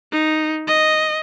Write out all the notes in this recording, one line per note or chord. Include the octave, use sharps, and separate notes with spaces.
D#4
D#5